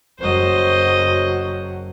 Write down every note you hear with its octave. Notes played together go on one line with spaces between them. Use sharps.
F#1 F#3 C5 D#5